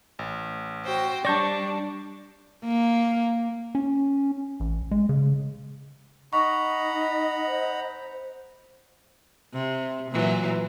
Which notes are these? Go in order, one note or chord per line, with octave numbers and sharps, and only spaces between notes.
A1
F#4 C5 G5
G3 D4 D5 A5 C#6 G6 A#6
A#3
C#4
A1
G#3
C#3
D#4 D#5 F#5 A#5 B5 C#6
C5
C3
A#2 E3 F#3